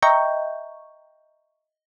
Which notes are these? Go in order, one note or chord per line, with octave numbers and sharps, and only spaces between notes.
D#5 E5 G5 A#5 C#6 G6